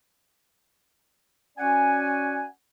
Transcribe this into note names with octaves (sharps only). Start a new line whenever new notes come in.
C#4 F#4 D5 F#5 G#5